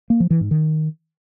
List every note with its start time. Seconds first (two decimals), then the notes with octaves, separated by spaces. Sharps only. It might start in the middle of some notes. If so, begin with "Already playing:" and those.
0.10 A#3
0.20 F3
0.30 E3
0.41 G#2
0.51 D#3